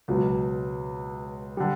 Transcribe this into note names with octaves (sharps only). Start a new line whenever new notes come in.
C#2 B2 F#3
D3 G3